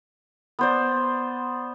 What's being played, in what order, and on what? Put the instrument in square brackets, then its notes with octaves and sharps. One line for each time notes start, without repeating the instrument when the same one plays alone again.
[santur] B3 C5 D5